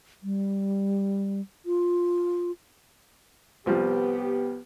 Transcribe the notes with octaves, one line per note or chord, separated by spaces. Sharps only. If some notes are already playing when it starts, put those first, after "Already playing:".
G3
F4
C2 F3 G3 B3 G4